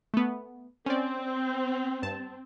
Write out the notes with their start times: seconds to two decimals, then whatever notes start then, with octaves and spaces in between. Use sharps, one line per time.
0.14 A3 B3
0.86 C4 C#4 D5
2.02 G2 A5